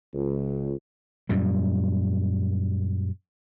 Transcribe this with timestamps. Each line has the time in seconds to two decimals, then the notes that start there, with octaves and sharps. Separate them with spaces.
0.14 C#2
1.29 F#2 A#2 G3